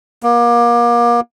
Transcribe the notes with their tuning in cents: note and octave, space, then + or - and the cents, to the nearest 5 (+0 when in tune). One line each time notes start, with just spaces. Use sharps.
A#3 +30